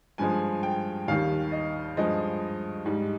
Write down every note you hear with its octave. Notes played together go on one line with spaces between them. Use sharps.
G2 F3 G#3 G#5
G5
D#2 D#3 G3 F5
D#5
G2 F3 G#3 D#5
G#2 G3